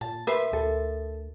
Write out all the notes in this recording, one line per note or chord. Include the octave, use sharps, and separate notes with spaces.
A#2 A5
A#4 B4 E5 C6
D2 A4